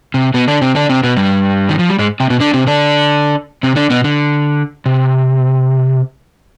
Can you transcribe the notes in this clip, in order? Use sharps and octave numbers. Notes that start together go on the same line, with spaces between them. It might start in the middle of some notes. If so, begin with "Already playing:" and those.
C3
B2 B3
D3 D4
C3 C4
D3 D4
C3 C4
B2 B3
G2 G3
D#3
F3
G3
G#2 G#3
C3 C4
B2 B3
D3 D4
C3 C4
D3 D4
C3 C4
D3 D4
B2 B3
D3
C3